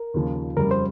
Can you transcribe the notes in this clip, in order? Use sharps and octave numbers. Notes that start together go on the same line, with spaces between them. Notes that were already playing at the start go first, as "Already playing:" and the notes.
Already playing: A#4
D#2 C#3 F3
F2 C#3 G3 A#4
C5